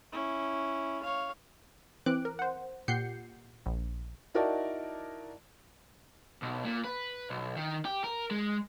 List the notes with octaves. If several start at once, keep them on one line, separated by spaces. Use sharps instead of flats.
C#4 E4
C#5 F5
E3 C4 D6 F#6 D7
A#4
C5 F#5
A#2 G4 F#5 G6 C7 C#7
A#1
D#4 E4 F#4 A#4 D5 A5
B1
A#2
B4
B1
D#3
G4
A#4
G#3